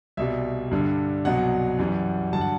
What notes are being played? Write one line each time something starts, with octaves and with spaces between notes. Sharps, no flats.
C2 B2 G3 E5
G2 D3 G3
C2 B2 F#3 F#5
F#2 E3 G3
G2 D3 F#3 A5
F#5